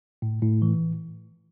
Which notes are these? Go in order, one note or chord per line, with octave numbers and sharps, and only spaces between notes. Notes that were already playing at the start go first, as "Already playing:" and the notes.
A2
A2
E3